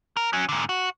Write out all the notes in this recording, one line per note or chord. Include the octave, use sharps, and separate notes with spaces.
A#4
F#3 C#4
G#2 D3
F#4